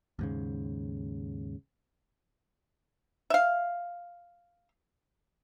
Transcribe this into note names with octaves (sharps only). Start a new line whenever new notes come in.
D#2 G#2 C#3
E5 F5